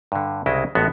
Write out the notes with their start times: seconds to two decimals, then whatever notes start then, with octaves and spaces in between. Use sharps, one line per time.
0.12 G2 D3
0.46 C2 C#3 G#3 E4 D#5
0.75 A1 A2 G#3 B3 F#4